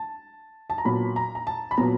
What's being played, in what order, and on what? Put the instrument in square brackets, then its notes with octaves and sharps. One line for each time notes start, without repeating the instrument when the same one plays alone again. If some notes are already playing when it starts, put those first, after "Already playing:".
Already playing: [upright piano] A5
A5
A#5
A#2 F#3 B3 B5
A#5
A#5
A5
B5
A#2 F#3 B3 A#5